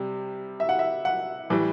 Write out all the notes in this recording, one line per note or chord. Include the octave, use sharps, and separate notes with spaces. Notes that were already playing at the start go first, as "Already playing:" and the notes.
Already playing: C3 G3
E5
F#5
E5
F#5
A2 E3 G3